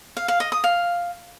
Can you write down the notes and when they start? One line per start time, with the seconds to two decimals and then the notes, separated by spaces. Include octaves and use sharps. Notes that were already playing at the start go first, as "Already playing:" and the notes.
0.17 F5
0.28 F5
0.40 D#5
0.52 D#6
0.64 F5